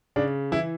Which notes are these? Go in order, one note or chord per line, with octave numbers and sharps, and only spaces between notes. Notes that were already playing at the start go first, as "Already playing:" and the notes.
C#3 D4
E3 E4